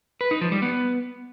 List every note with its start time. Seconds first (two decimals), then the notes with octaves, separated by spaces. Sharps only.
0.21 B4
0.31 D#4
0.41 F3
0.52 G3
0.62 B3